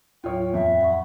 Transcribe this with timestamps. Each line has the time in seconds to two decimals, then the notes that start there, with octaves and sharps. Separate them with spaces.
0.24 D#2 A2 F#3 F4 C#5 G5
0.54 F2 E5
0.81 F#5 B5 C#6